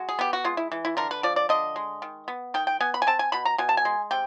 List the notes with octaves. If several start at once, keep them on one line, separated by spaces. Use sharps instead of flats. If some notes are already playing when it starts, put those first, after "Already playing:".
Already playing: G#3 F#4
G#4
B3 G4
F#4
G#3 F4
E4
E3
E4
D3 A#4
B4
F3 D5
D5
D3 D#5
G#3
D#3
B3
D#3 G5
G5
B3 G#5
B5
G#5
C4 A5
G#5
B2 B5
A#5
B2 G#5
A5
G#5
G#3
C3 G5